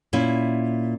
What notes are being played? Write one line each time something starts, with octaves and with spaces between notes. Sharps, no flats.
A#2 C#4 E4